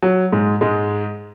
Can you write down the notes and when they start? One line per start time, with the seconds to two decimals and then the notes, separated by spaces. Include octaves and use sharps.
0.02 F#3
0.32 G#2 G#3
0.61 G#2 G#3